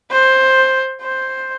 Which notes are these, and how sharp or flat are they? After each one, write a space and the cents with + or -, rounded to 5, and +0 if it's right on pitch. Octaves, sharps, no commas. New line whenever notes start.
C5 +10
C5 +5